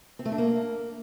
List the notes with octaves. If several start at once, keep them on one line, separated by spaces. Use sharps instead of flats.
C4
A3
D4
A#3